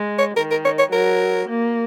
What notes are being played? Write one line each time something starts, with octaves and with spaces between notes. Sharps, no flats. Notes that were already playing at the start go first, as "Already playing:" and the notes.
Already playing: G#3
C#5
D#3 A#4
A#4
C#5
C#5
F#3 A#4
A#3